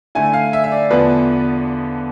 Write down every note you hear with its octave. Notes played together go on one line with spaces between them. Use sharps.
D3 A3 E4 G#5
F5
E5
E5
D5
E2 D3 F3 B3 D4 B4